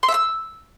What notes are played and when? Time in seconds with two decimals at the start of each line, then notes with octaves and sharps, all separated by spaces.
0.03 C6
0.08 E5
0.14 E6